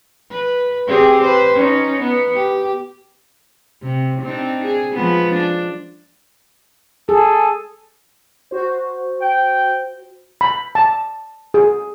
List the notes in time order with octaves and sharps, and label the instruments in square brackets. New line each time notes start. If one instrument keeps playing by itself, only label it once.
[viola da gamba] B4
C4 G4 G#4
B4 C5
C#4 D#4
B3
G4
C3
C4 D4 D#4
G#4
F3 G#3 B3
D4
[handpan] G#4 [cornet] A4
[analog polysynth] F#4 C5
[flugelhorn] G5
[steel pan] B5
A5
G#4